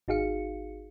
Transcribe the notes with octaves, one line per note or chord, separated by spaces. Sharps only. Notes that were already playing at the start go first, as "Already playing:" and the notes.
G#1 D#4 F#4 G#4 F5 C#7